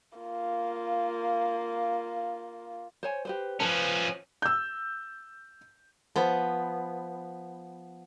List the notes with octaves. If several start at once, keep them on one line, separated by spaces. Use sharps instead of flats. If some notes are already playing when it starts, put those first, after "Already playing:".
A#3 F4
C5 C#5 G#5
G4 B4 C5
F3 C#4 B4 C5 A5
E6 G6
F3 B3